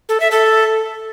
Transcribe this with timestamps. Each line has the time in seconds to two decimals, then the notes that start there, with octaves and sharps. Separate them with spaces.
0.09 A4
0.20 E5
0.31 A4